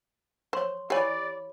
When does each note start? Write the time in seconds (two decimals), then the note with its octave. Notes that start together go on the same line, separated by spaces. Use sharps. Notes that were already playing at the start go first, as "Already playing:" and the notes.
0.53 C5 C#5 C6 C#6
0.90 E3 G4 C#5 D5 G#5 B5